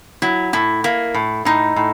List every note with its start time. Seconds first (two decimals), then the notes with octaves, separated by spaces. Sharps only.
0.22 F#3 E4
0.53 A2 E4
0.84 A#3 E4
1.14 A2
1.45 A2 D#4
1.76 A2